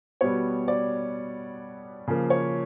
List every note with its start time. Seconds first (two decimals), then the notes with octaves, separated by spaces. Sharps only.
0.21 B2 G3 B3 C#5
0.68 D5
2.07 C#3 F3 A#3
2.30 C#5